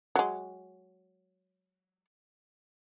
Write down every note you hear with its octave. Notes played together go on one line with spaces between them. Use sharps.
F#3 G#3